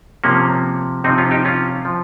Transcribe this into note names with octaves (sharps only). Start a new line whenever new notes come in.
C3 F3 A#3 C#4
C3 F3 C4 D#4
C#4 F4
D#4 G4
C#4 F4
F3